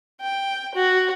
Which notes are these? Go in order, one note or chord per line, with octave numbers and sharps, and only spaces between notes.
G5
F#4